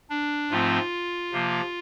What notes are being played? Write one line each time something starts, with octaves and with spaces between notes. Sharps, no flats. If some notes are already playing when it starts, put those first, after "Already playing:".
D4
G#2 F3 A3 C4 F4
C3 F3 A#3